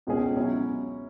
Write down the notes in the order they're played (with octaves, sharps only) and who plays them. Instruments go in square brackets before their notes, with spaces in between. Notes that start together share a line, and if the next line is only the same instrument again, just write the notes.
[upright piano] C#2 B2 G#3 C#4 G#4
B2 F#3 C#4 E4